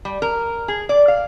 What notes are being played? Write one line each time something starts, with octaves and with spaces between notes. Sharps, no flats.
G3
A#4
G#4
D5
F5